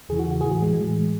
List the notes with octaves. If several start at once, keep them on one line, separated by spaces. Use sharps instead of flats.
E2 C#3 E3 G#4
F#4
F#4
A2 E3 G#4
F#4
G#3
A2 E3 G#3